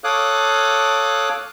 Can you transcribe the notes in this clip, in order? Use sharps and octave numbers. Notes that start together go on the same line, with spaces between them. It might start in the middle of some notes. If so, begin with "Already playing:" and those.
A4 C#5 F5 D6 D#6 F#6